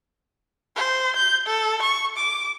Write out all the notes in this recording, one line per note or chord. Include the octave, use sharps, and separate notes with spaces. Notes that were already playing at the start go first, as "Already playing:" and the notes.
C5
G6
A4
C#6
D6